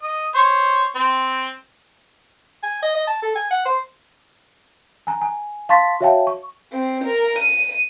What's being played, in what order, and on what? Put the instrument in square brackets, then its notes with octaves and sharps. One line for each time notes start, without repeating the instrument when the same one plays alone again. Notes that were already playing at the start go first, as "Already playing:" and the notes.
[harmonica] D#5
C5 C#5
C4
[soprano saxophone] G#5
D#5
D#5
A5
A4
G#5
F#5
C5
[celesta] G#5 A#5
G#5
F5 A5 C6 C#6 A6 B6
F#4 C#5 E5 F5 G5 A5
C#6
[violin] C4
A#4
D#7